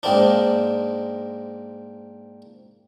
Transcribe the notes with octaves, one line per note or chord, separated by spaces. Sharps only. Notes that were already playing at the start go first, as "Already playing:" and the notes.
G#2 A#3 C4 D4